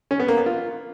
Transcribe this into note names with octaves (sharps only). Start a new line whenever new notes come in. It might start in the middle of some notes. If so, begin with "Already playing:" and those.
C#4
B3
A#3
B3
F4